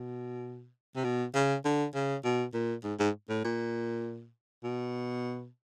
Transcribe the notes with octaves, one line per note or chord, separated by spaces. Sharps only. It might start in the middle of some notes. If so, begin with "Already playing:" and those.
Already playing: B2
C3
B2
C#3
D3
C#3
B2
A#2
G#2
G#2
A2
A#2
B2